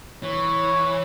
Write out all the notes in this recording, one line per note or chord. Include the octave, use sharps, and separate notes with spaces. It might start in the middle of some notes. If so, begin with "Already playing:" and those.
E3 C#5